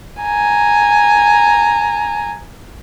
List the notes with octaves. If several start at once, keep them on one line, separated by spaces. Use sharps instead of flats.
G#5 A#5